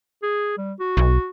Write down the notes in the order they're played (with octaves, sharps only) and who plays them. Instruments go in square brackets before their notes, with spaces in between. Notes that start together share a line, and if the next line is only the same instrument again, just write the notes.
[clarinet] G#4
G3
F#4
[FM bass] B1